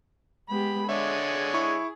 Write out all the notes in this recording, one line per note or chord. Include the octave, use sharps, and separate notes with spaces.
G#3 B3 G4 B5
D3 G#3 G#4 C#5 E5
E4 C#6